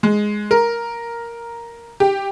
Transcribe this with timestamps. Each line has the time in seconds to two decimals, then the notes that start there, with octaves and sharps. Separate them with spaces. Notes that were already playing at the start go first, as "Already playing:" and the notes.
0.03 G#3
0.51 A#4
2.00 G4